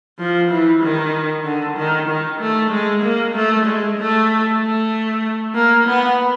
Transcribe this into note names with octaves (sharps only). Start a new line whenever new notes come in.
F3
E3
D#3
D3
D#3
D#3
A3
G#3
A#3
A3
G#3
A3
A3
A#3
B3